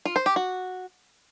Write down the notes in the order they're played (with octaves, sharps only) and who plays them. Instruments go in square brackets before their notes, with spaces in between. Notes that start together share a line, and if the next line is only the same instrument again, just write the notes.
[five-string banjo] F4
C5
G4
F#4